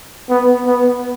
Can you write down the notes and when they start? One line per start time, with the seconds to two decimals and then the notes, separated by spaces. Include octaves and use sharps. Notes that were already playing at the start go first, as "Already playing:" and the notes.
0.29 B3
0.66 B3